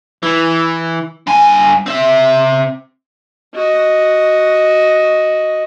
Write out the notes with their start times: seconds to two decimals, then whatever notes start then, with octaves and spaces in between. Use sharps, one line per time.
0.23 E3
1.27 G2 G#5
1.87 C4 E5
3.54 F#4 D#5